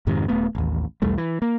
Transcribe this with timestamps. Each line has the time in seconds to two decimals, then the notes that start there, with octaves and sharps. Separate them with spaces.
0.07 F2 G#2 C3 D#3
0.28 D#1 A3 B3
0.55 A1 D#2
1.02 B1 E2 G3 A3
1.18 E3
1.42 A#3